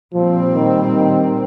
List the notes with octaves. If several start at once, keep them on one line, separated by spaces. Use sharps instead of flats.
A#2 F3 G3 C4
D#3
D#3